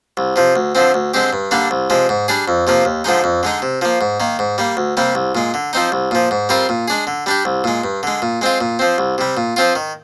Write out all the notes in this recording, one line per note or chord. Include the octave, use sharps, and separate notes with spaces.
C2
C3 F3
D2
D3 F3 C4
D2
D3 G#3 C4 G4
G2
D3 G3 A#3 D4
C2
C3 F3 G#3
G#2
G3 D4 G#4
F2
C3 F3 A#3
D#2
D3 F3 G#3 D#4
F2
D3 G#3 D#4
C3
F3 A#3
G#2
D#3 A#3
G#2
G3 A#3
D2
C3 G3 A#3
C2
A#2 G#3
D3
F3 C4 D#4
C2
A#2 F3
G#2
G3 C4 F4 A#4
A#2
G#3 D4 G#4
D3
G3 D4 G4
C2
A#2 G#3
G2
D3 G#3
A#2
G#3 C4 F4
A#2
F3 C4
C2
C3 G3
A#2
F3 C4 F4
D#3